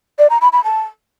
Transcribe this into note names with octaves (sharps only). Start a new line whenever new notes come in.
D5
A#5
B5
B5
A5